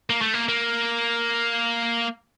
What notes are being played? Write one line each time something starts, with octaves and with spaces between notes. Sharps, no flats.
A#3
A3
A#3
A#3